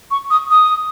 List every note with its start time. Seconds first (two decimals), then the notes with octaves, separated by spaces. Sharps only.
0.11 C#6
0.30 D#6
0.50 D#6